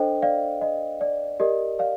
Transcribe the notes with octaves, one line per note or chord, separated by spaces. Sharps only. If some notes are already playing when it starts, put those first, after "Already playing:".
Already playing: D4 A4 C5 D#5 G5
D5 F5
D#5
D5
G4 A#4 D5 D#5
D5 F5